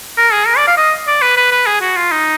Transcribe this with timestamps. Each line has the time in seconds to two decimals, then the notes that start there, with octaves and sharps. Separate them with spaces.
0.18 A#4
0.32 G#4
0.47 A#4
0.57 D5
0.67 F5
0.77 D#5
1.07 D5
1.22 B4
1.37 B4
1.52 B4
1.67 G#4
1.81 F#4
1.96 F4
2.12 D#4